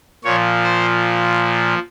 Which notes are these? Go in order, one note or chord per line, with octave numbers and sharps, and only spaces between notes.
A#2 F3 C#5
C5